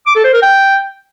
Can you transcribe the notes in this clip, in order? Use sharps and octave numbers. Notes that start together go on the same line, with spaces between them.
D6
A4
C5
A#4
G5